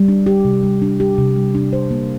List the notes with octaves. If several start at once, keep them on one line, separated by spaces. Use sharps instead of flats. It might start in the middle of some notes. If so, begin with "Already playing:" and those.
Already playing: G3
D4
G4
C3
G3
D4
G4
C3
G3
D4
C5
A#3